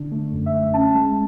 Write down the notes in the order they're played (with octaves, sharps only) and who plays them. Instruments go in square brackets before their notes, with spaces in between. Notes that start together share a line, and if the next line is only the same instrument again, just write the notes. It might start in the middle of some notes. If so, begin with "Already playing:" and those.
Already playing: [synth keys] D3 D4
A3
F#2
E5
A3
C#4 A5
G#3